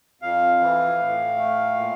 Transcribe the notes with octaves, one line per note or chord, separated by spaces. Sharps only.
F2 F5
E3
A2
A3
A#2